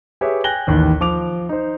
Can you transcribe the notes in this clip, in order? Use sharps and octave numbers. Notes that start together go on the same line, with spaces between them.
G4 G#4 B4 C#5 E5
G5 G#5 F#6 A#6 F#7 G7
A1 D#2 D#3 F#6
F3 D6 F7
D#4 C5